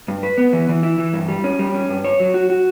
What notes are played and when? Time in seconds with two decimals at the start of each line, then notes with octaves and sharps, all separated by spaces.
0.08 G2
0.23 B4
0.38 B3
0.53 E3
0.69 E3
0.83 E4
0.98 E3
1.13 G2
1.28 G3
1.44 C#4
1.59 G3
1.74 C#4
1.89 G2
2.04 C#5
2.19 F#3
2.34 F#4
2.50 F#4